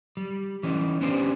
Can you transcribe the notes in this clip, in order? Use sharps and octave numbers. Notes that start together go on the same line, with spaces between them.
G3
E3 C#4 D#4
B3 C#4 D4 G4 C5